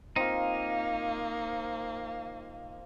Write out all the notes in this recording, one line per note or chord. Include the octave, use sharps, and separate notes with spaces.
A#3 C4 D#4 F4